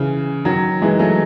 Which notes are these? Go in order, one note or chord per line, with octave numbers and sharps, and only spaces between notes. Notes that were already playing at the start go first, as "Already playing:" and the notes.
Already playing: C#3 E3
D#3 F#3
E3 G#3
F#3 A3